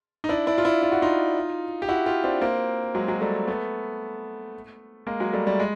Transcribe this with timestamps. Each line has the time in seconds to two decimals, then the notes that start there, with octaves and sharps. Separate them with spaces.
0.24 D#4
0.29 D4 E4
0.47 D4 E4
0.58 F4
0.65 D4 E4
0.82 F4
0.92 F#4
1.02 D#4 F4
1.82 G4
1.89 E4 F#4
2.06 F4 G4
2.24 C4 D4
2.41 A#3 C4
2.95 F#3 G#3
3.08 F#3 G#3
3.21 G3 A3
3.48 A3 B3
5.07 G#3 A#3
5.20 F#3 G#3
5.33 G3 A3
5.47 G3 A3
5.60 G#3